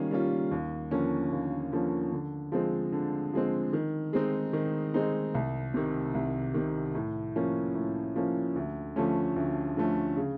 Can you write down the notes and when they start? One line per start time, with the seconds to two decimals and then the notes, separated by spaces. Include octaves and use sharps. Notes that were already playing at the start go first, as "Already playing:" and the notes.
Already playing: D#3 G3 A#3 C#4 F4
0.11 G3 A#3 C#4 F4
0.51 D#2
0.91 D3 F3 A#3 C#4
1.32 D#2
1.72 D3 F3 A#3 C#4
2.12 D3
2.52 F3 G#3 C4
2.92 D3
3.33 F3 G#3 C4
3.73 D#3
4.13 G#3 C4 D#4
4.53 D#3
4.94 G#3 C4 D#4
5.35 C2
5.74 C3 D#3
6.15 C2
6.54 C3 D#3
6.95 A2
7.36 F3 A#3 C#4
7.75 A2
8.16 F3 A#3 C#4
8.56 D2
8.96 D3 F3 A3 C#4
9.36 D2
9.77 D3 F3 A3 C#4
10.17 C#3